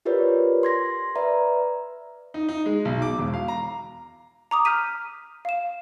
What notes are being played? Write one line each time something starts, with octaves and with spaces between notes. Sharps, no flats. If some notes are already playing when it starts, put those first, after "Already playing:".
F4 G4 A#4 B4 C#5 D5
C6 G#6 A#6
B4 D5 E5 A#5
D#4
D#4
G#3
B1
D6
E1
F5
A#5
A#5 D6 D#6
F6 G6 B6 D#7
F5 E7